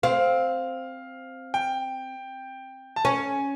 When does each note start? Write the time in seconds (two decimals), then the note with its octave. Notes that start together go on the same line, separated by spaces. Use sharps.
0.03 C4 F5
1.54 G5
2.96 A5
3.05 C#4 G#5